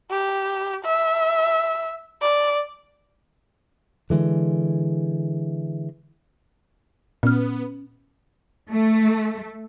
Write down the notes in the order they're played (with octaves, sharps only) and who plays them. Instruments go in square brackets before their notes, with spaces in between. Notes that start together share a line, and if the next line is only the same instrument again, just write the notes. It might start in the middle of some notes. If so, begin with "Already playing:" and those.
[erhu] G4
E5
D5
[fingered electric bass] D3 E3 G#3
[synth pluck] A#2 [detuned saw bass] B3 [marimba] C#4 F6
[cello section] A3